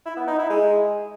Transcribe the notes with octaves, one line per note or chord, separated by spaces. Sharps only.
E4
B3
D#4
E4
G#3